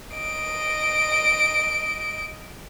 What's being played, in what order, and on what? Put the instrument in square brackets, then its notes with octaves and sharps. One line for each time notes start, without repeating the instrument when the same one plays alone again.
[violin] D#5 D7